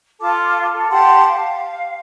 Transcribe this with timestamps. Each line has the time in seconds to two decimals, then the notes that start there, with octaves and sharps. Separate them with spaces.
0.19 F4 A4 A5 D6
0.72 A4
0.90 G4 F#5 A5 C6
1.27 F5